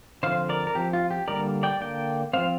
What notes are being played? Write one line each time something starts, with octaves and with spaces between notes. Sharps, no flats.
D3 F3 C4 C5 F5
A#4 D5
A#4
F3 C4 G4
F4
G4
D3 G3 A#3 A#4 D5
D5 G5
D3 A#3 D5 G5
F3 C4 C5 F5